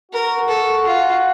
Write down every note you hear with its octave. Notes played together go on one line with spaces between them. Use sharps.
F#4 A#4
A4
F4